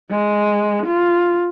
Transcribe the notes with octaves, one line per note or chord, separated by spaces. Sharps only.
G#3
F4